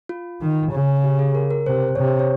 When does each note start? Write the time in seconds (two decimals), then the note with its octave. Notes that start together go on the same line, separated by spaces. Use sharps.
0.09 F4
0.41 D#3
0.72 C#3
1.04 G4
1.19 G#4
1.35 A#4
1.51 A#4
1.66 C3 C5
1.95 C3 C#5
2.08 C5
2.19 C#5